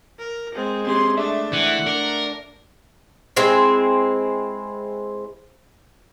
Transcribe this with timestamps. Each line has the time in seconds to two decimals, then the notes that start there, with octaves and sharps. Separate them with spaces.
0.19 A#4
0.55 G#3 C4
0.87 C4 G4 G#4 C6
1.17 A3 D4 E5
1.53 E3 F#5
1.86 D4 A#4
3.36 G#3 C4 E4